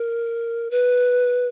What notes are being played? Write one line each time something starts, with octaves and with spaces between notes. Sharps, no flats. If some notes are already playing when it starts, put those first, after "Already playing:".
Already playing: A#4
B4